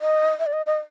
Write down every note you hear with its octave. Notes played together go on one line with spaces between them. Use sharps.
D#5
E5
D5
D#5
D#5